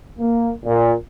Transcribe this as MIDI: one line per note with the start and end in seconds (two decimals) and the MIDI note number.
0.19 0.52 58
0.66 0.93 46